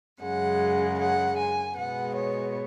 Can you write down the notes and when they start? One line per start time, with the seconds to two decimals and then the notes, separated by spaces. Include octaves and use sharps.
0.22 F#2 C#3 G#3 F#5
1.00 F#5
1.37 G#5
1.77 B2 G#3 B3 F#5
2.16 C#5